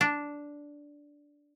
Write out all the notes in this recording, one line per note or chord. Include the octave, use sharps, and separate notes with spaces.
D4